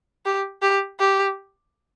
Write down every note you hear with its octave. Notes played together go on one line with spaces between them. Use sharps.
G4
G4
G4